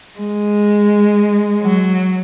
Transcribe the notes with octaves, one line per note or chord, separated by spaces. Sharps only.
G#3
F#3